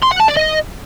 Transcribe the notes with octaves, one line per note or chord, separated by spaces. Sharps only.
C6
F#5
A5
D5
D#5